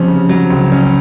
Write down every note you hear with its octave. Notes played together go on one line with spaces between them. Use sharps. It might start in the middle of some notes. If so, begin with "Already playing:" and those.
Already playing: C3 F3 C#4
C#3
F#3
C#2
C#4